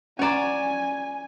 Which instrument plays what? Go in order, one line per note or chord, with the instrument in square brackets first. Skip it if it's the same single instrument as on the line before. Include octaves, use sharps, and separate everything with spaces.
[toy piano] C#4 A#5 [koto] C#5 D5 [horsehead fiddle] G#5